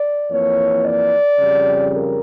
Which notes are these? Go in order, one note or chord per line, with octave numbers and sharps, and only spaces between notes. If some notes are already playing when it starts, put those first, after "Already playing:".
Already playing: D5
F2 E3 A#3 C#5
D5
F2 C#3 G3
A#4